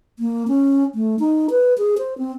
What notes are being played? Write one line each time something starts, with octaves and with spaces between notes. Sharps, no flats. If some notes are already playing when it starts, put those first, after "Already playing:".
A#3
C#4
A3
D#4
B4
G#4
C5
C4